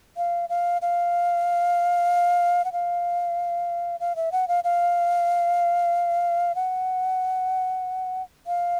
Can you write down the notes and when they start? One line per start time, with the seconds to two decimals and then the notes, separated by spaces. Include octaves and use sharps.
0.17 F5
0.49 F5
0.82 F5
2.65 F#5
2.72 F5
4.00 F5
4.16 E5
4.32 F#5
4.48 F5
4.64 F5
6.55 F#5
8.47 F5